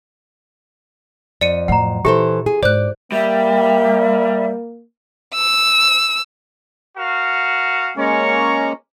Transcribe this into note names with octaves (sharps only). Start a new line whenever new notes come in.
F2 D5 C#7 D#7
A2 F#3 F#5 A#5
A#2 E3 G4 A4 C5 E5
G#4
G#2 C5 D5 F#6
G3 A#3 E5
E6
F#4 A#4 F5
G#3 A#3 C#4 C#5 A#5 C#6